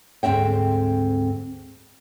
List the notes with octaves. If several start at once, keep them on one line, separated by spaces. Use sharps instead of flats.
D2 G#2 E3 C4 E5 G5